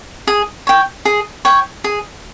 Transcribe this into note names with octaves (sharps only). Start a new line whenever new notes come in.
G#4
C#5 G5
G#4
C#5 G5
G#4